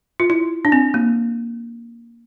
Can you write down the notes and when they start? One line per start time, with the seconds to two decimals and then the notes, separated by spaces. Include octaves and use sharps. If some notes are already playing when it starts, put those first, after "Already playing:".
0.20 F4
0.30 E4
0.65 D4
0.72 C4
0.94 A#3